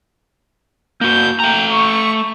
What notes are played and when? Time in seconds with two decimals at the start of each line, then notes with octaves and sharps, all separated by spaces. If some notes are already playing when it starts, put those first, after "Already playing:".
1.01 A#3 F#4 G6
1.40 A3 G5 A#5
1.71 C#6